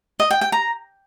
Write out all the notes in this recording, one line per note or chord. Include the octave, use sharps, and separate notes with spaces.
D#5
G5
G5
A#5